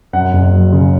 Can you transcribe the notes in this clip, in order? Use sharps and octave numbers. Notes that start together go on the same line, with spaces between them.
F#2 F#5
F#1
F#3
C#3